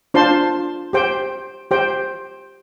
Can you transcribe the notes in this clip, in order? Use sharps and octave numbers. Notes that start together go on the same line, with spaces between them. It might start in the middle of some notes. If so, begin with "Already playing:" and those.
D4 F4 C5 A5 C6
G4 C5 G5
G4 C5 G5